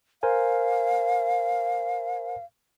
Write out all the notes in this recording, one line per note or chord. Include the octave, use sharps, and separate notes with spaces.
A#4 C5 F5 G#5